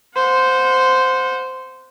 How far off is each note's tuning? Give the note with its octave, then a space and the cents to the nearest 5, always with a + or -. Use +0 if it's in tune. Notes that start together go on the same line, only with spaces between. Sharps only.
C5 -10 F#5 -30